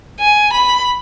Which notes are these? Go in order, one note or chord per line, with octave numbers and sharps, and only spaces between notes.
G#5
B5